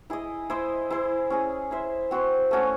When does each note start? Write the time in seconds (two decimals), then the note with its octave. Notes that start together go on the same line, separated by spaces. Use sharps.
0.10 E4 G#4 D#5
0.50 E4 C5 D#5
0.90 E4 G#4 C5
1.30 C#4 G#4 D#5
1.71 E4 C5 E5
2.11 C4 F#4 C5
2.51 A3 C#4 F#4